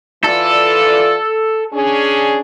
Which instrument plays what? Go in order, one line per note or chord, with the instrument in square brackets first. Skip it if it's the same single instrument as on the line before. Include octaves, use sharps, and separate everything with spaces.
[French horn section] E3 F4 D5 [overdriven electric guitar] A4
[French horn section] C#4 D4 G#4